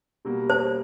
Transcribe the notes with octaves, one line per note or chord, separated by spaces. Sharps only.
B2 G3 A#3
C5